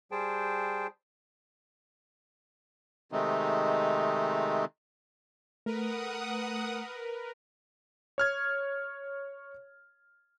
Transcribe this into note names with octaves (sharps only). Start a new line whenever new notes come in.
G3 G#4 C5 G5 A5
C3 D#3 G#3 A3 C4 D#4
A3 A#4 B4 F#5 D#6
C#5 F6 G#6